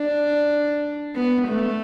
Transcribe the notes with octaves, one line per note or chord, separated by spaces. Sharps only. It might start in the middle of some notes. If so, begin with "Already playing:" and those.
Already playing: D4
B3
A3